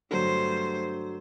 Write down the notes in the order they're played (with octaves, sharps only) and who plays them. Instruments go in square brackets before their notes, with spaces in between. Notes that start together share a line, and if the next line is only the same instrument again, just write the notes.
[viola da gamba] G2 A3 C5 [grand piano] D3 F#3